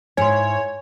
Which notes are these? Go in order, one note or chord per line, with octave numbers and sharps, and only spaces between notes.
G#2 E4 C#5 G#5 C6